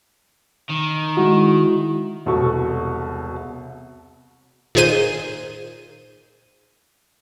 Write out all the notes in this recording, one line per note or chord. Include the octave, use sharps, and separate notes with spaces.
D#3
G#3 E4 F#4
E1 C2 B2 A4 C#6
A#2 D#3 G#4 C5 D#7